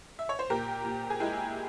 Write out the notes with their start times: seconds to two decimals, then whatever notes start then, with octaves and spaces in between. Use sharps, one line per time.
0.19 E5
0.29 C#5
0.39 C5
0.50 A#2 G4 A#4
0.85 A#2
1.10 G#4
1.20 G#3 E4 G4